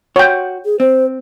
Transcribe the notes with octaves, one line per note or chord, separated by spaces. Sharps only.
F#4 C#5 G5
G#4
C4 C5